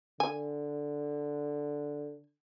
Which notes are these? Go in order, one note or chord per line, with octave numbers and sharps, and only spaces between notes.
D3 G#5